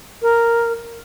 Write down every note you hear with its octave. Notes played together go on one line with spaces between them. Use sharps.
A#4